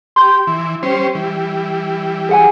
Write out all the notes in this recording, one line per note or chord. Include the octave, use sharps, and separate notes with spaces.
G4 C6 G6
E3
G3 C#4 C5
E3 G3
G#4 F#5 G#5